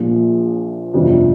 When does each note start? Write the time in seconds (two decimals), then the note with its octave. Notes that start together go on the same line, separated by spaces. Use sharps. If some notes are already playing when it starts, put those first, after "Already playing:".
Already playing: A#1 A#2 F3
0.94 G1 F2 C3 F3 D4